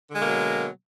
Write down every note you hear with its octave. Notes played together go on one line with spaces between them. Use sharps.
B2 D3 F#3 G#3 A#3